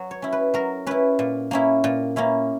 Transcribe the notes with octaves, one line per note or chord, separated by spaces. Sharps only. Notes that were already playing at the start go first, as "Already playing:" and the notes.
Already playing: F#3
C#5
C#4 E4
B4
F#3 A#4
C#4 E4 B4
A#2
A#3 C#4 E4
A#2
A#3 C#4 E4